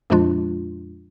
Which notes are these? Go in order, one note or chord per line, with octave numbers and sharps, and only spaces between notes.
F2 A#2 F3 G#3 D4 F4